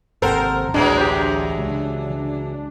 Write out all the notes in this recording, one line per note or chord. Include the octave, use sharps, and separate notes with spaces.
G#1 D#2 C3 A4 A#4 C5 F#5 G5
D1 A1 E3 F#3 G#3 D4
G4 C5
C#2